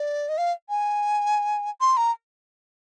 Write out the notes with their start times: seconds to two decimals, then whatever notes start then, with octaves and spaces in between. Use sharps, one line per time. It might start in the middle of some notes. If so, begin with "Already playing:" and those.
Already playing: D5
0.29 D#5
0.38 F5
0.69 G#5
1.81 C6
1.97 A#5